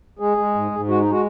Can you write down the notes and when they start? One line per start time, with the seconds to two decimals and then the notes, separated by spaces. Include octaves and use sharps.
0.19 G#3 G#4
0.37 G#3
0.55 G#2
0.71 G#2
0.88 G#3 F#4
1.00 G#3 D#4
1.11 F#4